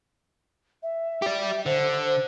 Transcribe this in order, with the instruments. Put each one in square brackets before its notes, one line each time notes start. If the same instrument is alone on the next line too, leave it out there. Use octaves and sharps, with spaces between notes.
[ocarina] E5
[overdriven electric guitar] G4 D5
[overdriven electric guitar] D3 [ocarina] C5